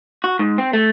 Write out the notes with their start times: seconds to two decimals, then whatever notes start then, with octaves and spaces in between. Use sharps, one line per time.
0.24 F#4
0.39 G#2
0.58 C4
0.73 A3